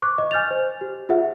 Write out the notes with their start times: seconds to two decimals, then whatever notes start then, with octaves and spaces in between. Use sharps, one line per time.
0.02 C#6 D6 F#6
0.18 D#5
0.31 G#5 F6 G6 A6 F7
0.51 C5
0.81 G4
1.09 F4 G#4 E5 F#5